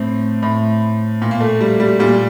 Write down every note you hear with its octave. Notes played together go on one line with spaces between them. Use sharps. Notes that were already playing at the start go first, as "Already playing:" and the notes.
Already playing: A2 C4
A2
A#2
A#3
A3
G3
G3
A#2 G3